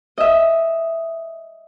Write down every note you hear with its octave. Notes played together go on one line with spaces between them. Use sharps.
D#5 E5